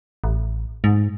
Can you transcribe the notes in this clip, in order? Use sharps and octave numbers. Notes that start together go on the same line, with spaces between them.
A1
G#2